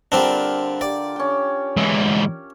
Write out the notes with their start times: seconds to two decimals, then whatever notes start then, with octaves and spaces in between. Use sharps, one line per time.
0.12 D3 G3 C4 D4 F4 A#4
0.81 G4 D5
1.16 C#4 G5
1.77 G#2 E3